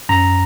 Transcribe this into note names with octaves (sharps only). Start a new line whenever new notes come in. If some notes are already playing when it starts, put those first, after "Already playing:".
F#2 A#5